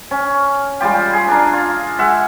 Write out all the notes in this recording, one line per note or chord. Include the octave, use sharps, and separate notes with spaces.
C#4
G3 G#3 F4 G4
G#4
D4 A#4
F4
G#3 E5 F#5